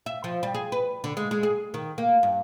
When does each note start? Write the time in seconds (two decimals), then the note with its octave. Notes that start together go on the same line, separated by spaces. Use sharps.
0.06 E5
0.24 F3
0.43 G3
0.54 G#4
0.72 B4
1.04 D3
1.17 G#3
1.31 G#3
1.43 G#4
1.74 D#3
1.98 A#3
2.23 G2